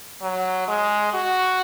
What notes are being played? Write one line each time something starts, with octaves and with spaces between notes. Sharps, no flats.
F#3
G#3
F#4